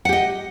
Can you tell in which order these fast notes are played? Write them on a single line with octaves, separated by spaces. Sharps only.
F#5 G4 D#5